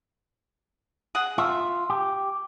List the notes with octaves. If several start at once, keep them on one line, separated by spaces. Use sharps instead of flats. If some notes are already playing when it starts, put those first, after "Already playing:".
G#4 F#5
F4 E5
G4